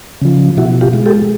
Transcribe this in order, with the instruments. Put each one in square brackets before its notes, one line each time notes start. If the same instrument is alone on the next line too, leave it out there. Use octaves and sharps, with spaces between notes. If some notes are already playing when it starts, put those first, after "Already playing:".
[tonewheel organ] C#3 F3
B2 E4 F#4
F4 G4
G#3
G4 A4